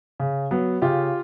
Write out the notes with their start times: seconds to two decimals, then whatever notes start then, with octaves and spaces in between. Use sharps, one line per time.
0.20 C#3
0.51 F#3 B3
0.82 C#3 F4 G4